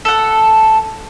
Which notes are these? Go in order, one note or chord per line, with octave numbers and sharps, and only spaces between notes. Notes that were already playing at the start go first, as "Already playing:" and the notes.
A4 F#5